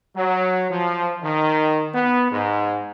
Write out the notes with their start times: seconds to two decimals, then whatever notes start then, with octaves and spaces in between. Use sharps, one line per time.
0.16 F#3
0.70 F3
1.22 D#3
1.94 B3
2.32 G#2